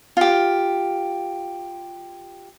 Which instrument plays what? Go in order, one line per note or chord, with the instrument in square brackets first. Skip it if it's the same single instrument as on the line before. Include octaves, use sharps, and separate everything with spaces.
[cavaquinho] F4 G4